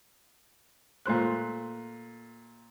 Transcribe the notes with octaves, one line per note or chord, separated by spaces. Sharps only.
A#2 A3 C5 F#6